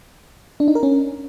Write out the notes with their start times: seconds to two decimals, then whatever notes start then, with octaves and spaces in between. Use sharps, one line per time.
0.60 D4
0.68 D#4
0.75 A#4
0.83 C#4